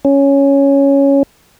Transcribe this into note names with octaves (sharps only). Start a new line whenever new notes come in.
C#4